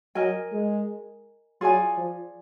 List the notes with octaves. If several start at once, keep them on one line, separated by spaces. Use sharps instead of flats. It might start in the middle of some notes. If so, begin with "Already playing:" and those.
F#3 A#4 D#5 G#5
G#3
F#3 F4 G#4 D5 G#5
F3